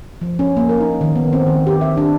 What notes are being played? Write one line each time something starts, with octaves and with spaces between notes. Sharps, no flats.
F3
C#4
A#3
A#4
D#4
D#3
B3
C4
D#3
G4
E5
D4